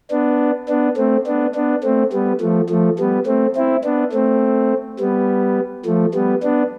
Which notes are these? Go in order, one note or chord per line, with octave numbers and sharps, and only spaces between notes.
B3 D4
B3 D4
A3 C4
B3 D4
B3 D4
A3 C4
G3 B3
F3 A3
F3 A3
G3 B3
A3 C4
C4 E4
B3 D4
A3 C4
G3 B3
F3 A3
G3 B3
B3 D4